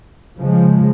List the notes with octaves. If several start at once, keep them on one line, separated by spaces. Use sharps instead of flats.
C#3 F3 G#3